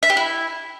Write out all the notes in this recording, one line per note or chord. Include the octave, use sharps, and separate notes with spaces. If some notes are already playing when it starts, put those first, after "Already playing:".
E5
G4
E4